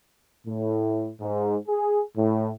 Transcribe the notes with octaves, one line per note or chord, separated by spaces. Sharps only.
A2
G#2
G#4
A2